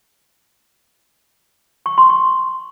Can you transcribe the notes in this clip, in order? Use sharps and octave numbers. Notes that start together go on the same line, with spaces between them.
C#6
C6
C#6